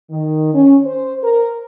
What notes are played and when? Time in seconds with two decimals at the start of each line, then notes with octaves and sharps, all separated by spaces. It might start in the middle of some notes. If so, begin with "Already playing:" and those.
0.10 D#3
0.53 C#4
0.85 C5
1.24 A#4